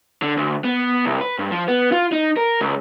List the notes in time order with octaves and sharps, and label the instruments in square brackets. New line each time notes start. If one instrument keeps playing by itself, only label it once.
[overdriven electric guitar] D3
D2
B3
C2
B4
G2
F3
B3
F4
D#4
A#4
C#2